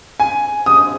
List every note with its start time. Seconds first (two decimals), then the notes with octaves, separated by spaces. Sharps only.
0.20 G#5
0.66 D#6